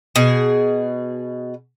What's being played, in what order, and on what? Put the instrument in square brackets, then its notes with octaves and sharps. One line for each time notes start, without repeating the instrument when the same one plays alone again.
[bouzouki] B2 G#4